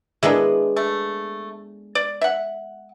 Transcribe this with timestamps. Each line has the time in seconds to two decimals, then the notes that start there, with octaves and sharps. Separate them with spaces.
0.23 G#3 B3 D4 E4 G#4 A#4
0.76 A3
1.95 D5
2.21 E5 F#5